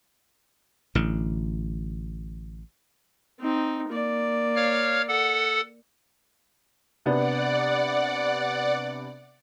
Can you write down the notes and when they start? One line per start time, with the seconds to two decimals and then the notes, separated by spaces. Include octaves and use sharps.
0.95 A1 D3
3.39 C4 D#4
3.88 A#3 D5
4.56 C#5 F5 F6
5.08 A4 F#5
7.06 C3 B3 D4 D5 F#5